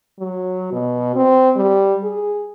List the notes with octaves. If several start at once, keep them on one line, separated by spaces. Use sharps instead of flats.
F#3
B2
C4
G3
G#4